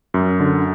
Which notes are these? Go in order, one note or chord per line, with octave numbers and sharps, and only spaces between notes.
F#2
D3